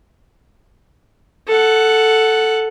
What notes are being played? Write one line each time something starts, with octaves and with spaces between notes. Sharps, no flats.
A4 F#5